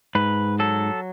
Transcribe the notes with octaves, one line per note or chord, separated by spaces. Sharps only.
G#2 B4
F#3 A4